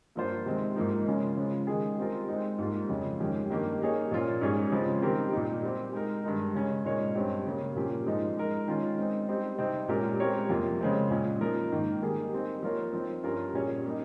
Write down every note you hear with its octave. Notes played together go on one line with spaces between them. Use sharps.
G2 F3 A#3 F4 C5
C3 D#3 G#3 C4
G#2 F3 A#3 D#4
C#3 G#3 C#4 F4
C#3 F3 G#3
D#3 G#3 D#4 G#4
G3 C4 F4 A#4
G#3 C4 D#4
G#2 G3 A#3 F4
F2 C#3 G#3
F2 D#3 G#3 C#4 G4
G2 D#3 A#3 D#4 G4
G3 A#3 D#4 G#4 C#5
A#2 F3 A#3 C#4 F4
G#2 G3 C#4 G#4 C#5
C#3 F3 G#3 C4
D#3 G3 C4 G4 A#4
A#2 G3 A#3 D#4
G3 C4 G4
G#3 D#4 A#4
G2 D#3 G#3 D#4 A#4
C#3 G#3 C#4
A#2 G#3 D#4 A#4 C#5
G2 G3 C4 G4 C#5
C#3 G3 A#3
A#2 F3 A#3 C#4 G4
G#2 F3 G#3 D#4
G#3 D#4 A#4
D#3 G#3 C#4 F4
G#3 C4 D#4
G3 C4 D#4
C3 G3 C4 D#4
A#2 G#3 C#4 G4 A#4
G#3 C4 G4 A#4 C#5
F2 C3 G3 A#3 F4
C#3 G#3 C4
A#2 G#3 C#4 G#4
F3 A#3 D#4 A#4
G#2 D#3 A#3
D#3 G3 A#3 D#4 G#4
G3 C4 D#4
F3 A#3 F4 A#4 C#5
F3 C4 D#4
G2 G3 C#4 F4 A#4
A#2 G3 C#4 G#4 C#5
G3 A#3 D#4